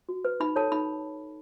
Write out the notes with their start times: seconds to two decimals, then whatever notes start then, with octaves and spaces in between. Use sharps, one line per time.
0.09 F#4
0.25 B4
0.40 D#4 B5
0.56 A4 C#5 A5
0.72 D#4 B5